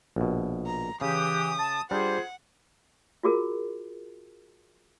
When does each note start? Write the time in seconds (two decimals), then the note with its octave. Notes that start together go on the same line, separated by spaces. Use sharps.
0.16 A#1 B2
0.66 A#5
1.01 C#3 E3 G4 D#6
1.59 A5
1.91 G3 D4 F4 G#4 C5 F#5
3.23 F4 F#4 G#4 A#4